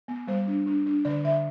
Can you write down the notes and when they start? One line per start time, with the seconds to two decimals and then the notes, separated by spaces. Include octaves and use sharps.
0.08 B3
0.27 G3 C5
0.48 D4
0.66 D4
0.86 D4
1.05 D3 D5
1.24 D3 E5